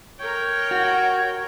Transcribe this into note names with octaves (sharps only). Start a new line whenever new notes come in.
A#4 C#5 G5
F#4